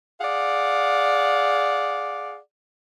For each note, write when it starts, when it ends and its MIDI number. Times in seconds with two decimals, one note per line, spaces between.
0.21 2.38 68
0.21 2.38 74
0.21 2.38 77
0.21 2.38 78